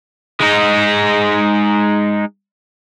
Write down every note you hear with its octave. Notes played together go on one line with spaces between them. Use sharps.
G#3 D#4